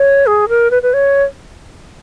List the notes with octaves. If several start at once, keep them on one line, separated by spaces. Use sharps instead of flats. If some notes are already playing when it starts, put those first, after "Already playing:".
Already playing: C#5
G#4
A#4
B4
B4
C#5